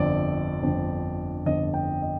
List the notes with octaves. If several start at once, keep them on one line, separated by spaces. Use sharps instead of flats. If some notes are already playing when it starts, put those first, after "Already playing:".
Already playing: G1 F2 D3 D5
G1 F2 D3
G1 F2 D3 D#5
G5
D#5